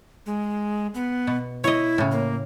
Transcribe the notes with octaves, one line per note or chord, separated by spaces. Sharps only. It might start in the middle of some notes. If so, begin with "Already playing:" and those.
G#3
B3
B2
E4 C#5 D#5
A2 C#3
A#3